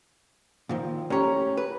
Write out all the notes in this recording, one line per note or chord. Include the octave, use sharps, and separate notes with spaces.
A#2 D#3 F3
A2 C#4 G4 C#5 A#5
B4